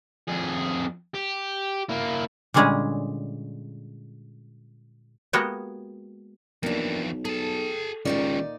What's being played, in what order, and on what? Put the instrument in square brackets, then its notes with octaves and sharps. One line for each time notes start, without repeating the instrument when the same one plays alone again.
[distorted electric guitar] F2 G#4
G4
A#3 E4
[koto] A#2 D3 G3 G#3 C#4 G#4
G#3 A#3 B3 F#4 G4
[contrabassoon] B1 [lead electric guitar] F2 E3 [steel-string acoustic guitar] A#3 D4
[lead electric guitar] G#4 A5 [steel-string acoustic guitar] A4
[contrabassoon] C#2 [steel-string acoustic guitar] A#2 D#4 D5 [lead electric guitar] D#3 C#4